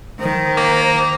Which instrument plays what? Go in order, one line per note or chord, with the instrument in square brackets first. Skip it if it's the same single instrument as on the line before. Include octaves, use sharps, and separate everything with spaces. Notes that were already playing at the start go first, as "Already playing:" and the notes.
[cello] D#3 [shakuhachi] C5
[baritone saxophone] A#3